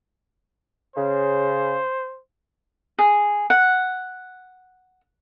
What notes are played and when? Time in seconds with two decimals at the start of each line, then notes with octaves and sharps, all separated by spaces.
0.96 C#3 C5
2.99 G#4
3.50 F#5